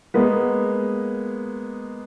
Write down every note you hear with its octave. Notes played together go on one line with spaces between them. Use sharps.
G#3 A#3 B3